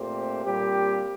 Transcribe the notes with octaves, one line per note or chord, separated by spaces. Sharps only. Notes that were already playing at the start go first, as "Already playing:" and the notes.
Already playing: A#2 A3 C4 G4 C5
A#2 G3 C4 G4